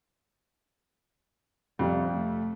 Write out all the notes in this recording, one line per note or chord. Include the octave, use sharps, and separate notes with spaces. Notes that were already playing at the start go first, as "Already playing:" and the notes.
F2 C3 G3
A3